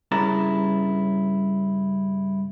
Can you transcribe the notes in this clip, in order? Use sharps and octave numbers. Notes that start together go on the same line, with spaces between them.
G2 C#3 E4 A5 A#5